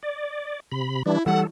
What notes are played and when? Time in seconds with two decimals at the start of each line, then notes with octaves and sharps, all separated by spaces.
0.03 D5
0.72 C3 B5
1.06 E3 G3 D4 E4
1.26 E3 G3 A4 F#5